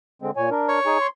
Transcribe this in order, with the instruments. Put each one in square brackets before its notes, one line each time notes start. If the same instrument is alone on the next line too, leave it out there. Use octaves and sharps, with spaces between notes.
[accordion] D3 G#3 C4
A#2 C#5 G#5
D4 A#4
[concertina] C#5
[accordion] D#4 G#4 G#5
C6